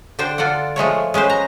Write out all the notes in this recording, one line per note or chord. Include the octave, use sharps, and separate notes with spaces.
D3 D4 C5 G5
D3 F4 A4 D5 F#5
F3 G#3 A3 C#5
G#3 C#4 B4 C5
A#5